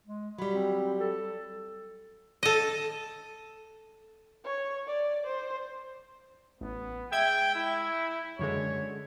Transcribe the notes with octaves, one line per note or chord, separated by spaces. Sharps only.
G#3
F#3 G3 B5
C4
A4
A4 D#5
C#5
D5
C5
A1 B3
G#3 E5 G5 G#6
E4
F#2 D3 G#3 C#5